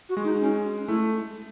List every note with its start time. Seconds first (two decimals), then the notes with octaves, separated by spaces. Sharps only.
0.09 F#4
0.17 G#3
0.24 D#4
0.41 C#4
0.88 A3 E4